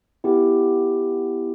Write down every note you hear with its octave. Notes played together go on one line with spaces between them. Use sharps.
B3 E4 G4